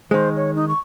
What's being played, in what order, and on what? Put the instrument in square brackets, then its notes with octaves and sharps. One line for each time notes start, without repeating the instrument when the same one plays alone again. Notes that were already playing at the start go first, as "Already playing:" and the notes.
[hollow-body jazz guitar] D#3 G#3 [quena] C5
[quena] C#5
D#4
C#6